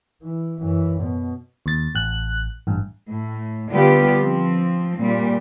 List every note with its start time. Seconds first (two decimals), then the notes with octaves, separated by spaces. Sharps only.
0.22 E3
0.60 F#2 E3
1.00 B2
1.66 D#2 A6
1.95 A1 F#6
2.67 A1 G2
3.08 A2
3.72 D3 G3 B3 F4 G4
4.20 F3 C4
5.00 A#2 G3